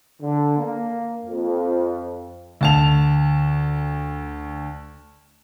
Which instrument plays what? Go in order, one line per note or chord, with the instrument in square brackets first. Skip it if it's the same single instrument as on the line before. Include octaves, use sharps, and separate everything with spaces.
[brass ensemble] D3
A#3
F2
[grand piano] D2 A5 F7